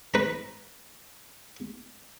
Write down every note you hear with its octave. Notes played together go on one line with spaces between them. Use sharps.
B4 A#5